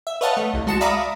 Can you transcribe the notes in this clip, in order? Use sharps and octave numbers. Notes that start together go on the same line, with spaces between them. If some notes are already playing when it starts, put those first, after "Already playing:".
E5
B4 C#5 D#5 F5 F#5 A5
A3
C2
G#3 F#4 A5 C#7 E7
D5 E5 F5 A#5 B5 D#6